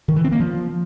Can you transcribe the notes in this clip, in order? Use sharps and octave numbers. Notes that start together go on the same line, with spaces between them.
D#3
E3
C4
A#3
F3